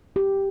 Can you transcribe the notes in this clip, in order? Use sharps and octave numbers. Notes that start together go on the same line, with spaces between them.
G4